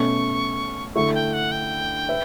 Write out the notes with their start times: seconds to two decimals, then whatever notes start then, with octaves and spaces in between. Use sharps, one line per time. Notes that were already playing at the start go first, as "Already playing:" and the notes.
Already playing: B2 A3 C#4 C#6
0.95 D3 A3 E4 C#6
1.14 G5
1.33 F#5
1.52 G5
2.09 B4 E5